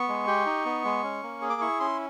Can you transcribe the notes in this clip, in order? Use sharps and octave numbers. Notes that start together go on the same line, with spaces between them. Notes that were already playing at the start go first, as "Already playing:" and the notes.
Already playing: B3 C#6
G#3
G4
D#4
B3
G#3
C#4
A#3
G#4
D6
E4 C#6
C#4 C6